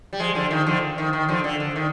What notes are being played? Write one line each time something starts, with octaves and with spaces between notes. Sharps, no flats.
G3
F3 G#3
D3 F3
D#3
D3 F3
D#3
D#3
D3 F3
D3
D3
D#3